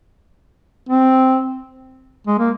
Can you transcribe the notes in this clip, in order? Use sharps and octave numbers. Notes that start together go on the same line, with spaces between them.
C4
G#3
A#3